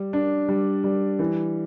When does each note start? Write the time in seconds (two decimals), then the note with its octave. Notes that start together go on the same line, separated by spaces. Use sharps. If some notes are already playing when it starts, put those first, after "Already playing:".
Already playing: G3
0.13 D4
0.48 G3
0.84 G3
1.19 E3